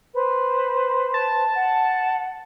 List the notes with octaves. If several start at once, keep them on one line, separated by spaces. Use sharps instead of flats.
B4 C5
A5
F#5